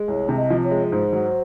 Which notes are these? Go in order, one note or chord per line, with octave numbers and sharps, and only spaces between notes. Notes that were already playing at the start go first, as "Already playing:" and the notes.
Already playing: G#3
C2 C#5
C3
D#5
F3
C#5
G#3
G#2 C5
F#3